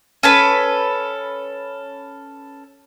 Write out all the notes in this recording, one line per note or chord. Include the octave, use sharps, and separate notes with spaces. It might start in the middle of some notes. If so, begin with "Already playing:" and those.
C#4 A4 B4